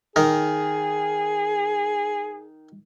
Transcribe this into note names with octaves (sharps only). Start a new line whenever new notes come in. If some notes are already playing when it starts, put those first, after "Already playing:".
D#3 G#4 A#4